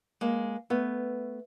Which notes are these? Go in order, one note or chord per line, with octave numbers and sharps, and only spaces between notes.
G#3 A#3
A3 B3